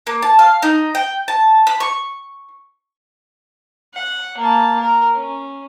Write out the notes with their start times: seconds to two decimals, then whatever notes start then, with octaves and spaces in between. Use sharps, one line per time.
0.07 A#3
0.22 A5
0.39 F5
0.62 D#4
0.95 G5
1.28 A5
1.67 B5
1.80 C#6
3.94 F#5
4.38 A#3 A5
4.81 A#4
5.14 C#4